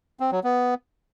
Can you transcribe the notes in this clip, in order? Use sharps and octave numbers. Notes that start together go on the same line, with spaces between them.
C4
F#3
B3